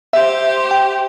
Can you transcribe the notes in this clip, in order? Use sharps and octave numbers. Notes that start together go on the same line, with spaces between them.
G4 C5 E5
G5